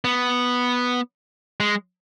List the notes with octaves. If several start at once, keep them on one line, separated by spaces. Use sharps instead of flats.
B3
G#3